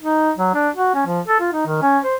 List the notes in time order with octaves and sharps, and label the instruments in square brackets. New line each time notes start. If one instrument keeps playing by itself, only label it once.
[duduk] D#4
F#3
D4
F#4
C#4
F3
A4
F4
D#4
D#3
C#4
C5